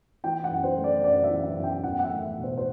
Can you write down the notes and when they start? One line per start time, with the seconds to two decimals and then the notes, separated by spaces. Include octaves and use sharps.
0.24 E3 G5
0.44 F#5
0.50 F#2
0.64 C5
0.77 A3
0.84 D5
1.04 F#2 D5
1.24 E5
1.30 E3
1.44 E5
1.57 F#2
1.64 G5
1.83 E2 F#5
1.99 F#5
2.04 E5
2.10 A3
2.37 B2
2.43 C5
2.58 C5